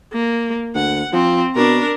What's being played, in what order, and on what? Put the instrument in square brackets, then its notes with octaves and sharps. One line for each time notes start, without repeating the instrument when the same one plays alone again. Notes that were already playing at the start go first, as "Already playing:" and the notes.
[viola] A#3
[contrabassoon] D2 [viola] F#5
[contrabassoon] F3 [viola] C4
[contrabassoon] B2 [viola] D4 A#4